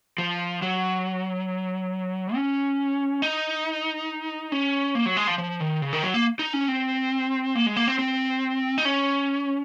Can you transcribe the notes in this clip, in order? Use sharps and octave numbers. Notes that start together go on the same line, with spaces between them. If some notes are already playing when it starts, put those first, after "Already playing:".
F3
F#3
C#4
D#4
C#4
A#3
F#3
G#3
F3
F3
D#3
C#3
D#3
F#3
A#3
D#4
C#4
C4
A#3
G#3
A#3
C4
C4
D#4
C#4